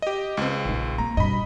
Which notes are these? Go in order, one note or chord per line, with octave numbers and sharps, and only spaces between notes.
G4 D#5
C#2 C4
A#1 D#4
A#3 A#5
G2 B2 D#5 B5